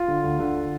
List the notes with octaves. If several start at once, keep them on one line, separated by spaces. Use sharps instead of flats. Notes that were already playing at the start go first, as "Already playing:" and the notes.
Already playing: F4
D3
D2
D3